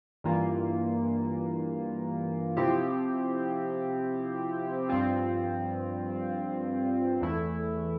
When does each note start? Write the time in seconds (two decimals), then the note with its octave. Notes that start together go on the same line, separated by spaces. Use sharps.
0.24 G2 E3 A#3 F4
2.57 C3 F3 C4 E4 G4
4.89 G2 F3 C4 F4
7.21 E2 E3 A3 E4